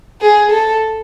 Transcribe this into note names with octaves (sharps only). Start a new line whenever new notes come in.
G#4
A4